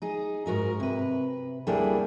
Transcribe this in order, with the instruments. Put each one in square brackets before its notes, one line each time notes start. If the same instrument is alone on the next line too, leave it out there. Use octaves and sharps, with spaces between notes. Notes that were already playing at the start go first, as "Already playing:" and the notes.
[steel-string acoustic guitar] D#4 G#4
G#2 F#4 A#4 D#5
C3 B4
D2 G3 A#3 D4 E4 G#4